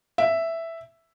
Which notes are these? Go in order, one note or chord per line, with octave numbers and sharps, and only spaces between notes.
E5